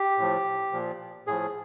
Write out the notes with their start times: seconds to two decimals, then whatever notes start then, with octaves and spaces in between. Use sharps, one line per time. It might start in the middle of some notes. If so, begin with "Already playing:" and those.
Already playing: G4
0.18 A2 F3
0.72 A#2 F3
1.27 A2 F3 G#4